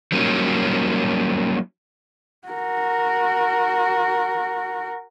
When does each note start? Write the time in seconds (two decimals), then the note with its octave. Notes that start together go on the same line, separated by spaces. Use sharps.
0.12 F#3 G3 A#3 C#4 D#4
2.48 F#4 A#4